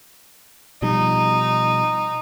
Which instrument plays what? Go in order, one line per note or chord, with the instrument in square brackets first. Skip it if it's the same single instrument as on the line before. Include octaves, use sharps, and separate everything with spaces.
[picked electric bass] B2 F3 G3 [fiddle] D#4